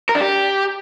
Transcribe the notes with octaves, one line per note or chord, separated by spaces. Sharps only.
A#4
D4
G4